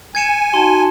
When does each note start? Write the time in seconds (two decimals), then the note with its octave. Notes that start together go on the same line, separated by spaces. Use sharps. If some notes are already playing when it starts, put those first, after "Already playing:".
0.15 G#5 G#6 C#7 E7
0.54 D#4 F#4 A5 C6